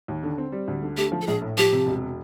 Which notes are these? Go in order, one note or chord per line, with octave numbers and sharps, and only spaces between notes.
D#2
D3
C4
G3
D2
D3
A3 G4
F3
A4
A#1 G#4
A2
F3 G4
C3
E1